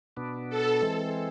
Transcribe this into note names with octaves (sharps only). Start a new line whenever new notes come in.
B2 B3 D4
A4
E3 G#3 C4